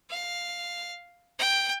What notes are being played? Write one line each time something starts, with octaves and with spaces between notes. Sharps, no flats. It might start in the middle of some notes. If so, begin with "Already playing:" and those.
F5
G5